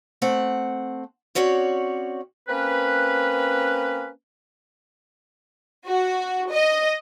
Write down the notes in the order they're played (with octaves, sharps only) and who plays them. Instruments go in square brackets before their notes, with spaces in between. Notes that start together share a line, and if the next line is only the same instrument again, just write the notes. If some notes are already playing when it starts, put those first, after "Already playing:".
[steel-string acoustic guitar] A3 C4 F#5
C4 C#4 F#4 C#5 D5
[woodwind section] A#3 C4 C#4 B4
[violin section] F#4
D#5